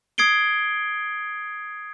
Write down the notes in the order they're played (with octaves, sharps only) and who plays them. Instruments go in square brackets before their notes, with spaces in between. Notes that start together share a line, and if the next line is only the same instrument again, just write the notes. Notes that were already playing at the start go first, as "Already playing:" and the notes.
[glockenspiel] D#6 G#6 C7 D7 G7